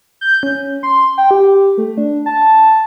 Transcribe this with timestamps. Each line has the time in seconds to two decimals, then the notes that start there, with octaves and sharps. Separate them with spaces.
0.21 G6
0.43 C#4
0.83 C6
1.18 G5
1.31 G4
1.78 A3
1.97 D4
2.26 A5